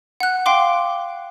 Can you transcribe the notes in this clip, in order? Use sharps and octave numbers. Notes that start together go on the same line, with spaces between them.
F#5 F#6
F5 G5 C6 D6